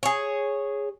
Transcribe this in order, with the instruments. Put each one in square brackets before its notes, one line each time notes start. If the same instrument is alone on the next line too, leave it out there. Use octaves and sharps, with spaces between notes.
[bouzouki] G#4 C#5